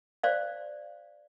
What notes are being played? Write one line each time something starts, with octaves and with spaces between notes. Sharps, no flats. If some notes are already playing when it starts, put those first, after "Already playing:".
C5 D5 F5